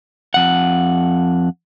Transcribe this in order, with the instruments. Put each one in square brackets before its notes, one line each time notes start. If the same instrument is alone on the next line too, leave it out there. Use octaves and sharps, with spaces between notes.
[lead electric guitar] F2 F#5